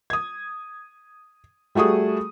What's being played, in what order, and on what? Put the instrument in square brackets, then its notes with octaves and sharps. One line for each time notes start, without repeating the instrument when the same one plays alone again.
[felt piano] D#6 G#6
G3 A3 F#4 G#4 D#6